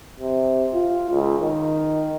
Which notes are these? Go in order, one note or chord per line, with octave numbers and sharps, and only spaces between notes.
C3
F4
C#2
D#3